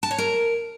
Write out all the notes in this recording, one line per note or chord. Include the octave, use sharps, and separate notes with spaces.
A5
C#5
A#4